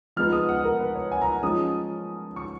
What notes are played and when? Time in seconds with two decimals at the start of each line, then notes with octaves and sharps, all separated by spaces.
0.16 F3 G#3 B3 D#4 F6
0.32 D#6
0.49 F#5
0.64 A#4
0.80 B4
0.95 C#5
1.12 G#5
1.21 A#5
1.43 F3 G#3 C#4 D#6
2.36 C#6